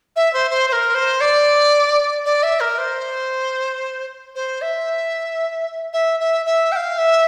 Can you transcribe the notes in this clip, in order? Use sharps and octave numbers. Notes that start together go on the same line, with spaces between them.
E5
C5
C5
C5
A#4
C5
D5
D5
E5
A#4
C5
C5
E5
E5
E5
E5
G5
F5
E5